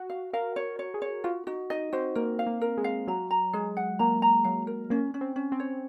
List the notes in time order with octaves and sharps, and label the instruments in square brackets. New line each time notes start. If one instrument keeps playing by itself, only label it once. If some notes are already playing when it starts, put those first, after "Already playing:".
Already playing: [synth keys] F#4
[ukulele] F5
[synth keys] A#4 [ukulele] F5
[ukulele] C#5
C#5
[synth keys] G#4
[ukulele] C#5
[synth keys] F4 [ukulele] F#4
[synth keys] D#4 [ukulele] F#4
[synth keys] D#4 [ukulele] D#5
[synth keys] C4 [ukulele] F#4
[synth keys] A#3 [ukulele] A#4
[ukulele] F5
[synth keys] A#3
[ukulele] A#4
[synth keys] G#3
[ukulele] F5
[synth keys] F#3 [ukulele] A#5
[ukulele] A#5
[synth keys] G#3 [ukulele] G#4
[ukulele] F#5
[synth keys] A#3 [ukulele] A#5
[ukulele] A#5
[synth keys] F#3 [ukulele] F5
[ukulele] A#4
[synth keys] A#3 [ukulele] C#4
[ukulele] C#4
[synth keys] C4
[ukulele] C#4
[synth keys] C4
[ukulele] C#5